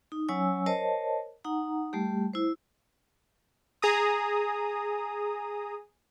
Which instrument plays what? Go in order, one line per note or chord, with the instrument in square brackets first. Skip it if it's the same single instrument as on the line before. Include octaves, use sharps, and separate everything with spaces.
[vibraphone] D#4
F#3 C#4 C#5 G#5 E6
A#4 C5 C#5 D#5 A5
D#4 F#5 A#5
G3 A3 G4
E4 C5
[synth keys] G#4 A#5 D#6